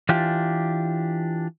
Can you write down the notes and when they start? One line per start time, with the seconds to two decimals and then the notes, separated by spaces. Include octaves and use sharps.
0.09 E3 D4 F4 G4